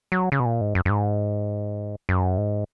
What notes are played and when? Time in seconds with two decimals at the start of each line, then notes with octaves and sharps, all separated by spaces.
0.12 F#3
0.32 C#3
0.40 B2
0.46 A#2
0.61 G#2
0.75 F#2
0.85 F#2
0.90 G#2
2.09 F#2
2.38 G#2